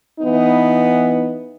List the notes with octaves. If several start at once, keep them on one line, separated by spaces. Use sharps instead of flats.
E3 B3 D#4